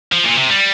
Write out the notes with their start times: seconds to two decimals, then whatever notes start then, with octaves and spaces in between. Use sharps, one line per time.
0.12 F3
0.25 A#2
0.38 C3
0.50 G3